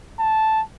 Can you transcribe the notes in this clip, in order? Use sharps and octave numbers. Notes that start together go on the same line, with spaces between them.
A5